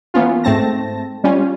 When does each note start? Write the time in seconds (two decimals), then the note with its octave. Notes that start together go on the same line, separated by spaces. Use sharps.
0.14 E3 A#3 B3 C#4 F4
0.44 G#2 A3 C4 A5 A#6
1.24 G3 C#4 F4